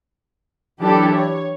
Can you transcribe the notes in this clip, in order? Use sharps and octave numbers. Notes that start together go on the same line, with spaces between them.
E3 F#3 D4 E4 G4 A4
C#5